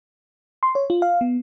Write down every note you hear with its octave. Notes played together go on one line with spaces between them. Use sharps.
C6
C#5
F4
F5
B3